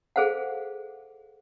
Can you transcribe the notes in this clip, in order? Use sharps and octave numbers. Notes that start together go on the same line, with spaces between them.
G#4 A4 C5 F5 F#5